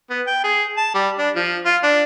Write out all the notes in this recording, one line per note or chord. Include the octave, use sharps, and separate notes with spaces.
B3
G5
G#4
A5
G3
D4
F3
F4
D4